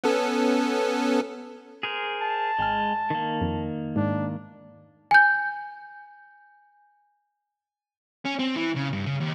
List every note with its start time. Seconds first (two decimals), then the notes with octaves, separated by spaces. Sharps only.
0.04 B3 C#4 A4
1.83 G#4 A#4 C5
2.22 A5
2.59 G#1 G#3 G#5 F6
3.10 D#3 A#3
3.41 F2
3.96 G#2 D4
5.11 G#5 G6
8.25 C#4
8.39 C4
8.56 E3
8.76 C#3
8.93 G2
9.06 C#3
9.20 D#2